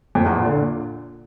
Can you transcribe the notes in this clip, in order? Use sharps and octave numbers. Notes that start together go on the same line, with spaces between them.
F2
E2
A#2
D3
A#2